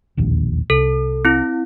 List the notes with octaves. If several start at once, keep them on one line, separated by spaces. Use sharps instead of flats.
E1 A#1 D#2
C2 A4
C4 E4